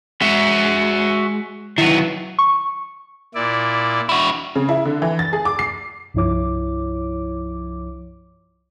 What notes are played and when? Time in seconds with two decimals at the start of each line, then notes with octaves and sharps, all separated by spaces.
0.21 G#3 F#4 E5
1.78 D#3 F#3 E4 B4 E5
2.39 C#6
3.35 A#2 E4 D5
4.09 E4 F#4
4.56 C#3
4.69 E4
4.85 D3
5.02 E3
5.19 A6
5.33 G#4
5.45 D6
5.59 C7
6.14 C2 G2 F3 E4 C#5 D6